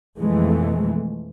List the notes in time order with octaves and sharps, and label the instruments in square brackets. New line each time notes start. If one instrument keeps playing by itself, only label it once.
[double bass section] F2 B2 E3 G#3 A3